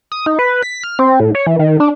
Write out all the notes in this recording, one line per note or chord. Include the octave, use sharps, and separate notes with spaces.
D#6
D#4
B4
B6
F6
C4
A2
C#5
E3
D#3
D4